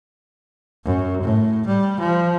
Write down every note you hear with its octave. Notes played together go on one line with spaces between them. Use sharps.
F#2
A2
G3
F3